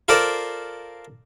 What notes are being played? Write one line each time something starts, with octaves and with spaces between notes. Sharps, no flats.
F4 A4 A#4 C5 D5